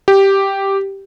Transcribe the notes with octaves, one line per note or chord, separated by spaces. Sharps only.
G4